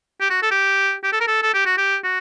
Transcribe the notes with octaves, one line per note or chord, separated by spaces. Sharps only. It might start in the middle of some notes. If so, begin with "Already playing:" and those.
G4
F#4
A4
G4
G4
A4
A#4
A4
A4
G4
F#4
G4
F#4